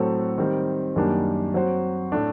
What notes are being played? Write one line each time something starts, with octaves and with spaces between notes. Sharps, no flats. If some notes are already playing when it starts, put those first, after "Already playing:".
Already playing: A2 F#3 C4 F#4 A4
D#3 G3 C4
F#2 D#3 G3 A#3 D4
F#3 C4 F#4 C5
A2 A3 D4